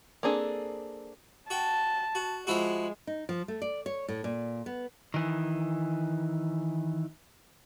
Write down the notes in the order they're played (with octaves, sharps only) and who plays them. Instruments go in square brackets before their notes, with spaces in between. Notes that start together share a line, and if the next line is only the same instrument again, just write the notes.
[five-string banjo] A#3 C4 D4 G#4 A4
[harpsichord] F#4 G5 [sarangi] A5
[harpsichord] F#4
[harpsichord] F3 E4 F#4 [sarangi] G#3
[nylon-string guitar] D#4
F3
A3
D5
C#5
A2
A#2
B3
[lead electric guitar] D#3 E3